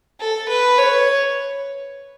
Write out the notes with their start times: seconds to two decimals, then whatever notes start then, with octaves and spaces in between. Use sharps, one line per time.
0.20 A4
0.48 B4
0.78 C#5